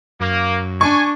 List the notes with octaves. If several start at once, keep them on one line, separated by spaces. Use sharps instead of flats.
F#2 A#3
D4 G#5 C#6